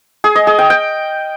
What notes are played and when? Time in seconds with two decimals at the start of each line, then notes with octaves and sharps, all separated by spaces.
0.24 G#4
0.36 D#5
0.47 G#4
0.59 G5
0.70 G5